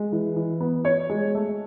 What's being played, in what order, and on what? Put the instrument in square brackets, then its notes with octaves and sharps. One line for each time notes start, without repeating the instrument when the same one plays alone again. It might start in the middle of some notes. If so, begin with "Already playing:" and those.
Already playing: [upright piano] G#3
E3
E3
B3
C#5
G#3
A3